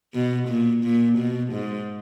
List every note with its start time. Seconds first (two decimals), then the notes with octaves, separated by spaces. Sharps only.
0.14 B2
0.48 A#2
0.84 A#2
1.18 B2
1.53 G#2